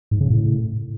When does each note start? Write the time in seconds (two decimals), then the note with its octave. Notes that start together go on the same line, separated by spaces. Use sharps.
0.11 G#2
0.21 C#3
0.30 A2